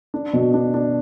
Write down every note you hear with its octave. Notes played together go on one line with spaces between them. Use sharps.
D4
B2
D4
D4